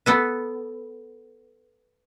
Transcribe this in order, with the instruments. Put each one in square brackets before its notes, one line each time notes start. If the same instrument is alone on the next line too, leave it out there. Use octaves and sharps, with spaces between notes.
[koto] B3 A4 B4